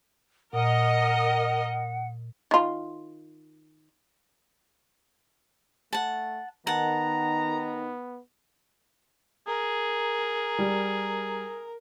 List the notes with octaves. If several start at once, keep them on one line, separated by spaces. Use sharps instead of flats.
A#2 A#4 D#5 F#5
D#3 F4
A3 F#5 A5
D#3 B3 D#4 F#5 A5 A#5
G#4 A#4
G3